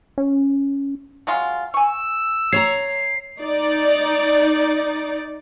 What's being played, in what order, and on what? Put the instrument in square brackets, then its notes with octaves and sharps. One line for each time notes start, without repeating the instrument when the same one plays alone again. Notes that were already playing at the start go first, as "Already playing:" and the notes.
[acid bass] C#4
[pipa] F#3 G#3 F4
[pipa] G#5 C#6 [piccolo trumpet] E6
[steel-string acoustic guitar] C#5 A5 A#5 [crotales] C7
[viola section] D#4 D5